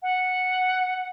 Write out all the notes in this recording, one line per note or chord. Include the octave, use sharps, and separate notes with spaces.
F#5